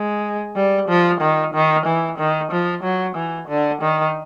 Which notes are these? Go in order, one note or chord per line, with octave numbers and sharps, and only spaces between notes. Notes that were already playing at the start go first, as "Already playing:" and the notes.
Already playing: G#3
G3
F3
D#3
D#3
E3
D#3
F3
F#3
E3
D3
D#3